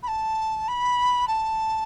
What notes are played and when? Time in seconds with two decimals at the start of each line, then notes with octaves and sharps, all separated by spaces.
0.03 B5
0.08 A5
0.68 B5
1.28 A5